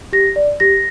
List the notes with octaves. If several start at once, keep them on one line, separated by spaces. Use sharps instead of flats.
G4 A#6
D5
G4 A#6